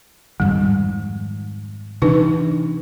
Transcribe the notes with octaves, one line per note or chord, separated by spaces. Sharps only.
F2 G#2 D#3 G3
C3 E3 D4 D#4 B4